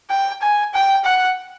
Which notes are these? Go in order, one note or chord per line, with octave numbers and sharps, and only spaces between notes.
G5
G#5
G5
F#5